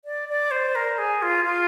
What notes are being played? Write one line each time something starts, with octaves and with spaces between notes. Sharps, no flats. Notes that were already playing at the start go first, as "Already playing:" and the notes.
D5
D5
C5
A#4
G#4
F4
F4